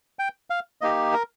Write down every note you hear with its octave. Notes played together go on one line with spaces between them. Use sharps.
G5
F5
A#3 D#4 G4 D#5
A#4